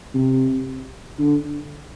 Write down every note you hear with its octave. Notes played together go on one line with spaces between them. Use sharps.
C3
D3